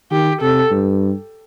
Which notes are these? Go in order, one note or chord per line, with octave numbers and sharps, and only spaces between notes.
D#3 G4
C3 A4
G2